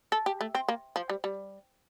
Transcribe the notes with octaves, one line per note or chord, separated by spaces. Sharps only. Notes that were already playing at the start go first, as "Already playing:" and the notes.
A4
G4
A3
C4
A#3
F3
G3
G3